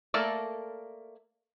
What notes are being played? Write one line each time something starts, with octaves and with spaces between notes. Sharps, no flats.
A3 A#3 A4 A#4 D5